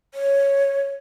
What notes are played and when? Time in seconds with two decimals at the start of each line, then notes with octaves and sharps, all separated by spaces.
0.14 C#5